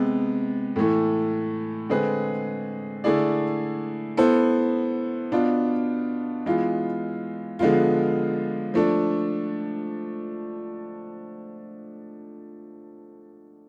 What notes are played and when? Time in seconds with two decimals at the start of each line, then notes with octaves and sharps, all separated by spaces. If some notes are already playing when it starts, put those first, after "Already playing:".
Already playing: C3 G#3 B3
0.76 A2 E3 A3
1.89 D3 G#3 C4 G#4 B4
3.04 D3 A3 E4 G#4 D5
4.17 B3 E4 A4 C5
5.32 B2 B3 D4 F4
6.46 E3 G#3 B3 F4
7.59 D3 F3 G#3 B3 F4
8.74 F3 A3 D4